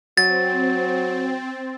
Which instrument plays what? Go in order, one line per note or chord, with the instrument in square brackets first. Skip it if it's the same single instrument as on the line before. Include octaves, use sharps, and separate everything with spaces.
[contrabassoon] F#3 [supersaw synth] C4 [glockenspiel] A6